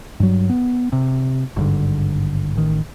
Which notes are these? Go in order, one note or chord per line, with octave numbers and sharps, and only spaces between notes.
G2 F#3
B3
C3
G#1 G2 D3
A1 D#3